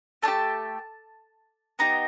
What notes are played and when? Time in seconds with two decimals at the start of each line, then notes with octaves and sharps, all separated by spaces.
0.23 A3 D4 A5
0.28 G4
1.79 B3 D#4 G4 A#5